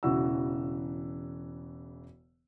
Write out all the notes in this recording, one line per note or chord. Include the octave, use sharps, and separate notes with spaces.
E1 C#3 E3 F#4 E6